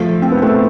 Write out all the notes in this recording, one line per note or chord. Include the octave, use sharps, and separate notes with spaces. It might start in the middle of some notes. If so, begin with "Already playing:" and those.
Already playing: F3 A3
C4
B3
A3 C4